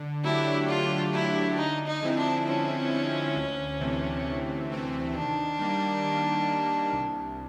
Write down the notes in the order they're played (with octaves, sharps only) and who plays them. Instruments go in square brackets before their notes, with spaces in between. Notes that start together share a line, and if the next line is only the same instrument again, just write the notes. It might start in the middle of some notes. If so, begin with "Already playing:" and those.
Already playing: [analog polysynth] D3
[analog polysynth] F#3 A3 D4 G4 [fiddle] E4
[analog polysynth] D3 [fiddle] F4
[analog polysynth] F#3 A3 D4 G4 [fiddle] E4
[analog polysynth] D3 [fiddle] D#4
[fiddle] D#4
[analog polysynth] F3 G#3 C4 E4
[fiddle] D4
[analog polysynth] D3 [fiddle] C#4
[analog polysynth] F3 G#3 C4 E4
D2
C3 E3 A3 C4
D2
C3 E3 A3 C4
[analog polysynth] D#3 [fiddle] D4
[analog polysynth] G3 A#3
D#3
G3 A#3
C2